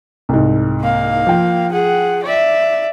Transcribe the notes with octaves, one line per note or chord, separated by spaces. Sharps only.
C2 G#2
A#3 F5
F3 G5
G#4 F#5
D5 E5